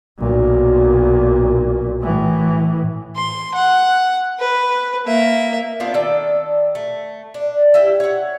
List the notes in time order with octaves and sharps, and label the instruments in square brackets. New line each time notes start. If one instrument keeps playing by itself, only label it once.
[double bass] B1 A#2
A2 E3
[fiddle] C6
F#5
B4
A#3 E5
[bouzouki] B3 C4 D4 F4
D#3 A4 D5 E5
A3
D4
E4 G4 E5
C#5 F#5